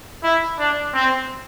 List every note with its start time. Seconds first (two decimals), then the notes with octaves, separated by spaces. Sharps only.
0.24 E4
0.59 D4
0.94 C4